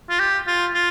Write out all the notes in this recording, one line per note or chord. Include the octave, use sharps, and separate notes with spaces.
F4
G4
F4
F4